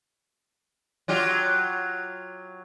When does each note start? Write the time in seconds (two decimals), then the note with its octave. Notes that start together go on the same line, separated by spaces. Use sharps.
1.08 F#3 F4 G4